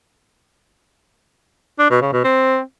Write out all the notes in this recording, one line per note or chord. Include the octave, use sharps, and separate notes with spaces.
D4
B2
C#3
B2
C4